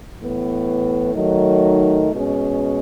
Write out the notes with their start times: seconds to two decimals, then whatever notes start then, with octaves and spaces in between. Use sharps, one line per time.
0.19 A2 E3 B3
1.14 D#3 F#3 A3 D#4
2.11 B2 G#3 C#4